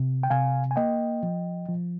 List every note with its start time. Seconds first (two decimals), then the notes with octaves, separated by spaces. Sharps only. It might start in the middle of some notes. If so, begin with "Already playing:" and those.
Already playing: C3
0.23 G5
0.30 C3 F5 G#5
0.71 G#5
0.76 A#3 D#5 G5
1.23 F3
1.68 F3